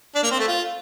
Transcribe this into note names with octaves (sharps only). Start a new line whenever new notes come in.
D4
A#3
C4
A3
F4